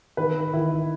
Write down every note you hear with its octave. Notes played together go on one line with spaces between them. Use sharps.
D#3 B4
D#3 E4